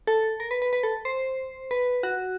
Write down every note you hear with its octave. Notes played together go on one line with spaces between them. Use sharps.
A4
A#4
B4
B4
B4
A4
C5
B4
F#4